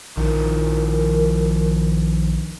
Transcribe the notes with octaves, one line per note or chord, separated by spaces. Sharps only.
A#1 D#3 F3 A#4